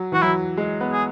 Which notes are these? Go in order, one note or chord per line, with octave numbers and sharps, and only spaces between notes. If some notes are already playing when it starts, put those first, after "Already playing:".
Already playing: F#3
E3 F#4
F#3 E4
G#3
B3
G#4